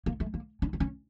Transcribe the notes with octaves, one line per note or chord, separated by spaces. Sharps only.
A#3
A3
A#3
C#4
C4
C#4